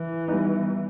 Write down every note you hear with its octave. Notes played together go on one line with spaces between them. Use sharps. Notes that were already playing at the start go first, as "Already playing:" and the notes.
Already playing: E3
G3 B3 D#4